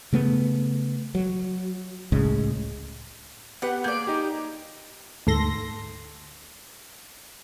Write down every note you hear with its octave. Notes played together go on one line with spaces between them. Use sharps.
C#3 A3 B3
F#3
C#2 A2 C#3 G#3
B3 G4 B4 F#5
A#3 G#4 D5 G6
D#4 G4
D2 G#2 A4 C6 A#6